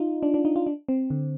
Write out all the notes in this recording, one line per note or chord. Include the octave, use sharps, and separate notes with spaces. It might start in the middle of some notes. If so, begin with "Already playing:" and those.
Already playing: D#4 F4
D4
D4
D#4
F4
D4
C4
D3